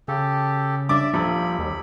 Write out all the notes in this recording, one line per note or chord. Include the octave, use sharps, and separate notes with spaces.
C#3 G4 A4
G3 D4 D5 E5 D6
D#1 F3 B5
D#2